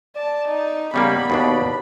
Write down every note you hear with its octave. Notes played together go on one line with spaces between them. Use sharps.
D5 A5
D#4
C#3 G3 A#3 B3 B5
D#2 B2 D4